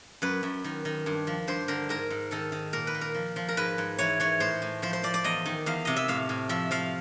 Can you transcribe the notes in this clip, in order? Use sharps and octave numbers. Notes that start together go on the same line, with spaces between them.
F#2 B4
F#2
D#3
D#3
G2
F3
G2 C5
D3 A#4
G#2 A#4
G#2
D#3 A4
D#3
A#2 A#4
B4
A#2
A#4
F3
F3
A#4
G#2 B4
G#2
E3 C#5
E3 C#5
A2 C5
A2
F3 C5
C5
F3 D5
D5
E2 D#5
D#3
E2 F5
C3 D#5
E5
A2 F5
A2
F3 E5
F3 F5